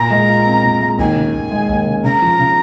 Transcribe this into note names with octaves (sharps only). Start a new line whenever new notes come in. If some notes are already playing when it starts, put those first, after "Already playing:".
Already playing: A#2 A#5
G#3
F4
C4
A#2
G#3
D#2 G#5
C#3
D#2
G#3
D#2
C#3
C#3 A#5
F3
C#3